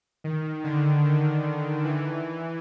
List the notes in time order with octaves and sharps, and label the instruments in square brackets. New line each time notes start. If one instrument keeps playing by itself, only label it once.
[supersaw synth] D#3
D3
D#3
E3